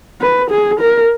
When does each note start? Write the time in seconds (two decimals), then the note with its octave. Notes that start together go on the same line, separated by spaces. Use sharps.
0.21 B4
0.51 G#4
0.80 A#4